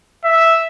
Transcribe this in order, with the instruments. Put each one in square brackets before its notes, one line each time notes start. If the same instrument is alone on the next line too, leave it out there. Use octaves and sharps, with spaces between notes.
[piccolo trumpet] E5